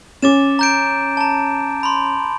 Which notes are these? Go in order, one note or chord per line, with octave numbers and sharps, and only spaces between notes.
C#4 D6 A6 E7
A#5 G6 D7
A5 A#5
B5 C6